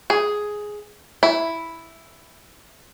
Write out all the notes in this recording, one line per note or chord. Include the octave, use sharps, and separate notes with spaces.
G#4
E4